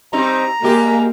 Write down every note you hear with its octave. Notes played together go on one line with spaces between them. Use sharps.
G3 C4 D#4 A#5
G3 G#3 A#3 G4